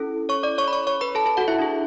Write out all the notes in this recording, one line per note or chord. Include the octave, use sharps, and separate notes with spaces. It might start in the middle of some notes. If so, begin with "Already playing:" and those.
Already playing: C#4 E4 A4
C#5 C#6
D5 D6
C#5 C#6
B5
C#5 C#6
C#5 C#6
B4 B5
A4 A5
A4 A5
F#4 F#5
E4 E5
D4 G#4